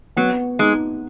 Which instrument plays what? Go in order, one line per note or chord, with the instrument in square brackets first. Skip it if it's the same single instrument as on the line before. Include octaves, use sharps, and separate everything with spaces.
[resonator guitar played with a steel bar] F#3 [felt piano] B3
[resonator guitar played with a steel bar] G#3 [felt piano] D#4